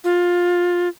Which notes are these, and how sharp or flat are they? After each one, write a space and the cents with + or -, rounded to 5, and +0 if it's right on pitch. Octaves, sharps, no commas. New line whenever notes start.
F4 +15